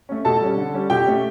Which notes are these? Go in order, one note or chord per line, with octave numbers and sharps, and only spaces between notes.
A3 C#4
B2 A4 A5
G3 C#4
D3
G3 C#4
B2 G4 G5
A3 C#4